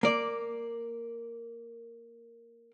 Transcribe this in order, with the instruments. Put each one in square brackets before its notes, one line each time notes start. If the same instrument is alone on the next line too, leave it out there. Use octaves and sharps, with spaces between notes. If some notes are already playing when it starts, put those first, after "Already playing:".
[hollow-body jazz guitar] A#3 D5